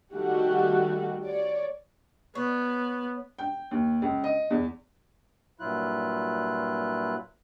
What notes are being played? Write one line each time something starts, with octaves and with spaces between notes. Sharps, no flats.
D#3 G3 A3 F#4 G4
C#5 D5
B3 C#5
G5
D#2
C#2
D#5
E2
G2 A#2 F#3 E4 F4 F#6